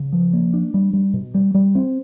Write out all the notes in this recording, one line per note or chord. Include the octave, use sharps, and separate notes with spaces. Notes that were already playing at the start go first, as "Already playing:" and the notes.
Already playing: C#3
F3
A#3
D4
G3
G3
B2
G3
G3
C4